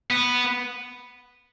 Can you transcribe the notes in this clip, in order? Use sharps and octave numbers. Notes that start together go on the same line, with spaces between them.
B3